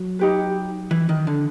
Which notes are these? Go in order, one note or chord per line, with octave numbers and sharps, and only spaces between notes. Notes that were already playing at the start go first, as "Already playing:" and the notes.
Already playing: F#3
D#4 G4 B4
E3
D#3
D3